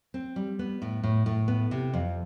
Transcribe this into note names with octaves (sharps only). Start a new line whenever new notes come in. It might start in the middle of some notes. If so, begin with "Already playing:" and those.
C4
G3
B3
A2
A2
A2
B3
C3
F2